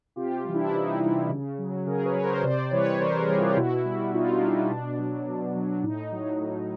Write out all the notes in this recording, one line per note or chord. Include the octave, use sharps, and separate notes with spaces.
C3 F4 G4
E3 G3
D4 E4
C3 D#4
E3 G3
C#3
F#3
C#3 G#4 A#4
B4 C#5
F#3
A#4 C5
C3 C5 D5
E3 G3 B4 C#5
C3 A#4 C5
G#4 A#4
E3 G3
F4 G4
B2 E4 F#4
G3
B2 D#4 F4
D4 E4
G3
D#4
B2 D4
F#3
B2
F#3
A2 D#4
F#3
A2